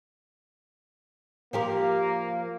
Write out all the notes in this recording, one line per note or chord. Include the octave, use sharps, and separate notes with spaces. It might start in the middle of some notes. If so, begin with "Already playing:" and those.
F3 A#3 G4 A#4